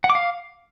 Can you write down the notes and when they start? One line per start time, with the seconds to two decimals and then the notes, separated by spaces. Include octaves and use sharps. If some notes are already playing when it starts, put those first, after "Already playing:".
0.04 F#5
0.10 D6
0.15 F5